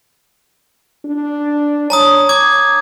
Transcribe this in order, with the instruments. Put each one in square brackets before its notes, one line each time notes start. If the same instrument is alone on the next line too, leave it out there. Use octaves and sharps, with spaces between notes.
[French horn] D4
[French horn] C#5 [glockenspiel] A5 A#5 D#6
[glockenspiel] D6 G#6